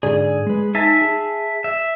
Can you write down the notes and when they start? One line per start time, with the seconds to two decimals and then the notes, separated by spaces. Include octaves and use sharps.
0.03 G#2 D3 G#4 D5
0.47 G#3 B4
0.75 D#4 E5 G#5 A5
1.01 G#4
1.64 E5